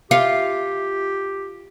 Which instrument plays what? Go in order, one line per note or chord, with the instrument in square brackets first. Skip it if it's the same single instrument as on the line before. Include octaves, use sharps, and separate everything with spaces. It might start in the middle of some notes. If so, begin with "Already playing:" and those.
[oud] F4 [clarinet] G4